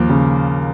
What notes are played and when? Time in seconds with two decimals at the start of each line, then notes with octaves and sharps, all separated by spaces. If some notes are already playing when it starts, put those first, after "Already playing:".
Already playing: D#2 F3 A#3
0.09 C#3